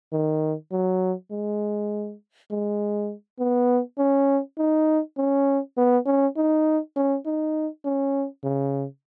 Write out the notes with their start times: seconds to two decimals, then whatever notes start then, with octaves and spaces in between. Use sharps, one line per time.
0.12 D#3
0.71 F#3
1.31 G#3
2.51 G#3
3.39 B3
3.98 C#4
4.58 D#4
5.17 C#4
5.78 B3
6.06 C#4
6.37 D#4
6.96 C#4
7.26 D#4
7.85 C#4
8.44 C#3